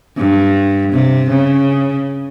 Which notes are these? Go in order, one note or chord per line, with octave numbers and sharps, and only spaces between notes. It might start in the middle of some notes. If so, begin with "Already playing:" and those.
G2
C3
C#3